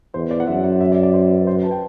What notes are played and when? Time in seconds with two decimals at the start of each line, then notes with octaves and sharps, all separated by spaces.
0.14 E2 C5
0.31 D5
0.40 F#5
0.47 F#2 E5
0.64 F#5
0.81 E5
0.92 D5
1.03 D5
1.14 C5
1.31 B4
1.47 C5
1.55 B4
1.63 A5
1.71 G5